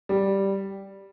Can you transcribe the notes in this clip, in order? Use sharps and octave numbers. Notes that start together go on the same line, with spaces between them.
G3